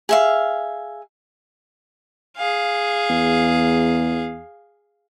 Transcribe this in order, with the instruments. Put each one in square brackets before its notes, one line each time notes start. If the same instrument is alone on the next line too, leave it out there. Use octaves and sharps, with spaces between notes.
[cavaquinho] G#4 E5 F5
[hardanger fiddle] G#4 F5
[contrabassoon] E2